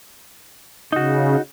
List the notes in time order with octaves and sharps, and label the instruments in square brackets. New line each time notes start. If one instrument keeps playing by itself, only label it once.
[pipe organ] C#3 [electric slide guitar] D#4 F#4